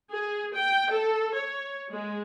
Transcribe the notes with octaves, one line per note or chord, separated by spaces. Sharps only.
G#4
G5
A4
C#5
G#3